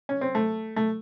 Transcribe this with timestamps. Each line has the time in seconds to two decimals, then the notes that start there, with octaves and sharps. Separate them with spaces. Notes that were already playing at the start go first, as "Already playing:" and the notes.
0.09 C#4
0.21 C4
0.35 A3
0.76 A3